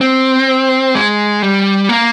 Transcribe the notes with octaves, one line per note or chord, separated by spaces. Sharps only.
C4
G#3
G3
A#3